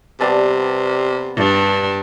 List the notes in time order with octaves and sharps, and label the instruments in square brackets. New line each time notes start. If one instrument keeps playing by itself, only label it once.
[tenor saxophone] C3 [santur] G3 B3 A5
[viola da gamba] G2 D4